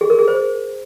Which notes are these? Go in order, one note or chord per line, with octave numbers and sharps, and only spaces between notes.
G#4
A#4
G#4
C5